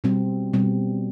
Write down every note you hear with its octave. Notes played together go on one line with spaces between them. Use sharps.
B2 G3 C4
B2 G3 C4